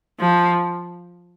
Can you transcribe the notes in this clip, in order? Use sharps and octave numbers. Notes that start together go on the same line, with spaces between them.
F3